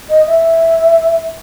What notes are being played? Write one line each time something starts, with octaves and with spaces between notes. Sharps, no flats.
D#5
E5